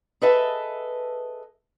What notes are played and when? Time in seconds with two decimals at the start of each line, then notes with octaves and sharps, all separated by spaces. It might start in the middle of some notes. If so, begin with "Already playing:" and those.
0.22 G#4 A4 B4 D#5 E5 A5